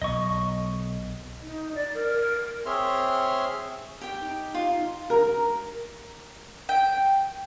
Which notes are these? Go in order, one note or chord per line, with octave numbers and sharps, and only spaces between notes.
B1 D#5 C#6
D#4
D5
A#4
C4 G#4 C#5 E5 C6 F6
G4 G5
D#4
F4
A#4
G5